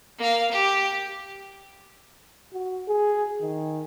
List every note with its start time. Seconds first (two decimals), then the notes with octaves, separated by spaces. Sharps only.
0.18 A#3 F5
0.51 G4
2.53 F#4
2.88 G#4
3.41 D#3